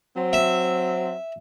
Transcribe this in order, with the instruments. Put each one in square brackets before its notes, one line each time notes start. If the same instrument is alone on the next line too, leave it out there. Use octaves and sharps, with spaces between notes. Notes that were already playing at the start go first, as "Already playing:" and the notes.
[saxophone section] F#3 C4
[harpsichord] E5